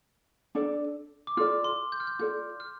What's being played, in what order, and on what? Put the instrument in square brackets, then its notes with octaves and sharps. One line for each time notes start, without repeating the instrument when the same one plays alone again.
[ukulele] D4 A4 D5
[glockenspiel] D6
[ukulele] F4 A4 D5 [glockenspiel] F6
[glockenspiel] C6
G6
F6
G6
[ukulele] F4 A4 D5 [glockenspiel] G6
[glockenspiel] F6